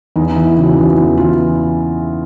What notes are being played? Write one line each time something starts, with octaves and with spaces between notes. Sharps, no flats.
E2 D#4
D#4
E3
E4
C#3 F#4
E2
E2
E3 F4